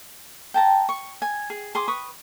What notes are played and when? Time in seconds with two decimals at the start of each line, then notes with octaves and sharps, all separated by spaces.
0.54 G5 A5 A#5
0.89 C#6
1.22 G#5
1.50 G#4
1.75 G#4 C6 D6 D#6
1.88 B4 C#6 D#6